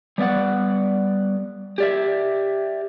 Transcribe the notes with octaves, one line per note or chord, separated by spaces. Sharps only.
G3 B3 D5 F#5
G4 D5 E5